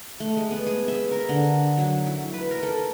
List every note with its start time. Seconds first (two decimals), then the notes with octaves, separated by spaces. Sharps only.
0.20 A3
0.37 G#3
0.51 B3
0.67 G#4
0.88 E5
1.11 A#4
1.29 D3
1.78 F#3
2.07 E4
2.33 B4
2.51 A#4
2.63 A4